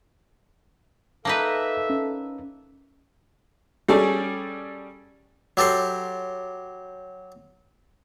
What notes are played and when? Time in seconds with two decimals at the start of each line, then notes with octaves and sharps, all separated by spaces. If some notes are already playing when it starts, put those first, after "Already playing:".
1.25 A#3 D#4 A4 B4 E5 A5
1.90 C#4
3.88 G3 C#4 G#4 A4 D5
5.57 F#3 G4 A4 C5